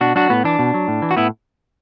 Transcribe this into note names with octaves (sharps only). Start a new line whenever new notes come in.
B2 D4 F#4
F#3 D4 F#4
A2 B3
E3 D4
B2
F#3
A2
E3
F#4
A2 B3 E4